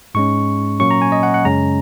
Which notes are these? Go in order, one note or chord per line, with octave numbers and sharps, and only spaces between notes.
G#2 G#3 C#4 C#6
A#2 F#3 A#3 C#4 C#6
A#5
G#5
D#5
F#5
F#5
F#2 C#3 G#3 C#4 A#5